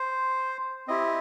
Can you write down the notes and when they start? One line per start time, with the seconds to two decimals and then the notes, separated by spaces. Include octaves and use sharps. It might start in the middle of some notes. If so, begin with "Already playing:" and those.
Already playing: C5
0.87 C4 E4 G4 D#5